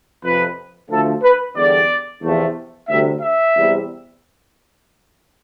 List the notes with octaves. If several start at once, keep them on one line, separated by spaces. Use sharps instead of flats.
F2 C3 F3 B4
D2 D3 F3 A3 A4
B4
E2 D3 G3 D5
E2 C3 F3 A3
D2 C3 G3 E5
E5
E2 C3 G3